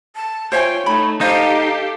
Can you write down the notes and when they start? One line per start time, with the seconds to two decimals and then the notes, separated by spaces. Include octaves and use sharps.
0.15 A5
0.52 F4 C5 C#5 E5 G5 G#5
0.86 A3 D#4 B5
1.21 D#4 G4 A4 C5 D#5 F5